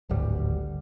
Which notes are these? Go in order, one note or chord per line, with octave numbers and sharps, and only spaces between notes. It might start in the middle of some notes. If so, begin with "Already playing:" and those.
D1 G#1 D2 G3